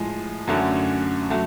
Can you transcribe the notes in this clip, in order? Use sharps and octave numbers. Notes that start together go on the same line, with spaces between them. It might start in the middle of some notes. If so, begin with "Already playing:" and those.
Already playing: A2 F3 G#3
F#2 D3 F#3 A3 C#4
F#3 A3